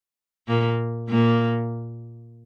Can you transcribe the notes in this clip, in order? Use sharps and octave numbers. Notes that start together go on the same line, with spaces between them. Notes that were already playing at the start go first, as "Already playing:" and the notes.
A#2 A#3
A#2 A#3